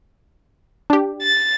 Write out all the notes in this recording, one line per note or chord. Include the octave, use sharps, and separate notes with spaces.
D4 G4
A6